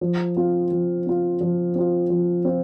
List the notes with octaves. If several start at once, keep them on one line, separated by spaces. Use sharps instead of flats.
F3
C4 F4
F3
C4 F4
F3
C4 F4
F3
C4 F4